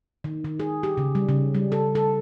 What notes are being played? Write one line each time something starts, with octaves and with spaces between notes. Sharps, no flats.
D#3
D#3
G#4
G4
C#3
G3
C#3
G3
A4
A4